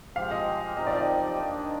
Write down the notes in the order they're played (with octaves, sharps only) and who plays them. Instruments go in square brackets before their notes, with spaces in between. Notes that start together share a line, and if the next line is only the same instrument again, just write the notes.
[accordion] F3 G#3 C4 G4 [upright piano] F5
[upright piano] D#5
[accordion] F3 C4 D#4 G4 A#4 [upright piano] D#5
[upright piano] D5
D5
[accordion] D#2 D#3 A#3 D4